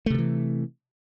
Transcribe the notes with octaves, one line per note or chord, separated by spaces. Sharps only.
C3 D#3 E3 A3